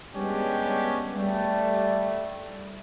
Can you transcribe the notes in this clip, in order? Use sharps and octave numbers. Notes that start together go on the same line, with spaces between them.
G3 G#3 B3 C#4 D4 G4
G3 A3